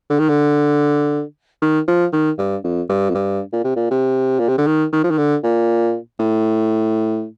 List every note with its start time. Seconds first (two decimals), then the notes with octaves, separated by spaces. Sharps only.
0.10 D3
0.19 D#3
0.29 D3
1.62 D#3
1.88 F3
2.13 D#3
2.38 G2
2.64 F2
2.89 G2
3.10 F2
3.15 G2
3.53 A#2
3.64 C3
3.76 A#2
3.91 C3
4.39 A#2
4.49 C3
4.58 D3
4.67 D#3
4.92 D#3
5.04 F3
5.11 D#3
5.18 D3
5.43 A#2
6.19 A2